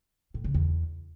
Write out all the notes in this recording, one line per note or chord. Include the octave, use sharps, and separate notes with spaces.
A2
C#3
E2